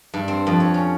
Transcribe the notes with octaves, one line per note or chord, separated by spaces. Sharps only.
G2
C4
F2
C#5
C#4